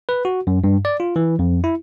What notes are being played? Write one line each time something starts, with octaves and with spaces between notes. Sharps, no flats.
B4
F#4
F#2
G2
D5
F4
E3
F2
E4